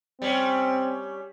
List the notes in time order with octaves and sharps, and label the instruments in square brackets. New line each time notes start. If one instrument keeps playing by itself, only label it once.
[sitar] G3 C#4 [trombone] C4